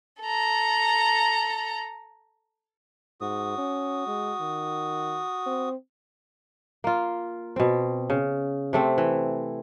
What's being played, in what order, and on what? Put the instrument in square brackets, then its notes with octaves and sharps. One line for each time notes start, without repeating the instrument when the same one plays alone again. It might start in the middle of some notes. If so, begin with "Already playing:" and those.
[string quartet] A4 A#5
[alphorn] G#2 [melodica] F#4 D#6
[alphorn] C#4
G#3
D#3
C4
[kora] A#3 F4
B2 C4
C#3
C3 A3 C4
E3